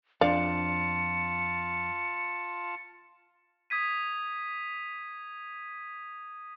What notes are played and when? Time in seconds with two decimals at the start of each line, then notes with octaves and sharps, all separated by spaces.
0.21 F2 D4 F4 D5 F5 A5 C#7
3.70 D#6 G#6 B6 D#7